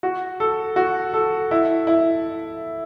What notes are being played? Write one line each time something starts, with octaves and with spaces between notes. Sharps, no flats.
F#4
A4
F#4
A4
E4
E4